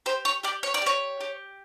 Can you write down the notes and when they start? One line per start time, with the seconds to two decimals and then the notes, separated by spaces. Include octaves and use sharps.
0.06 G4 C5
0.25 C#5
0.43 G4 D5
0.63 C#5
0.74 D5
0.82 G4 C#5
1.21 G4